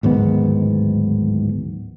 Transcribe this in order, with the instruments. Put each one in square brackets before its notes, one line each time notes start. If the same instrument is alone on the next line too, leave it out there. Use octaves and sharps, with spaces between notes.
[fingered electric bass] D1 G#2 D#3 B3